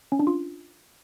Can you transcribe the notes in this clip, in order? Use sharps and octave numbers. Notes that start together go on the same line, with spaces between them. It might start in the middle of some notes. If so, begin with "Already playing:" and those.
C#4
D4
F4